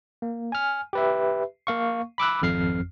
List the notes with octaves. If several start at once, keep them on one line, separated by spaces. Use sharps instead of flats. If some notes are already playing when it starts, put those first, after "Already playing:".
A#3
G#5 F6
G4 B4 E5
A#3 F5 C#6
B5 D6 E6 F#6
G#1 F2 F6 C7